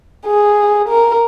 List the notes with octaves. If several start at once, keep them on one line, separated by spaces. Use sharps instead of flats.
G#4
A#4